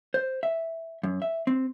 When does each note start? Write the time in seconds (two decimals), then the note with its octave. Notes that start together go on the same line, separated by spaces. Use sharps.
0.14 C5
0.43 E5
1.03 F#2
1.22 E5
1.47 C4